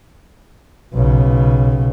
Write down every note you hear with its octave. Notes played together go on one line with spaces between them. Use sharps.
B1 C#3